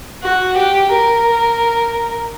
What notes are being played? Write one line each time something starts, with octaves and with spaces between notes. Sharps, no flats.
F#4
G4
A#4